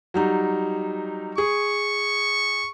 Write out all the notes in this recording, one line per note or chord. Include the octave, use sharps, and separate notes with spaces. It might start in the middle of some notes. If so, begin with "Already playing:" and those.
F#3 G3 D#4
G#4 C#6